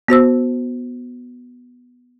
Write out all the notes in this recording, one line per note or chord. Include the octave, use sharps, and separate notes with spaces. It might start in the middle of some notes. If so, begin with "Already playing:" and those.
B3 F#4 C5 E6